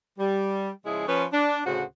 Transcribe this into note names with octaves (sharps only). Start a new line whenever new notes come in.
G3
C#3 F3 G#3 E4 G#4
F3 C#4 B4
D4
D2 A2 C#3 F#4 C5 F#5